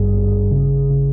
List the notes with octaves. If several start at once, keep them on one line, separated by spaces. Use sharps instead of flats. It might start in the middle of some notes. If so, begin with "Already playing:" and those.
Already playing: G#1 G2 G3 G#4
G#1
C#3
C#3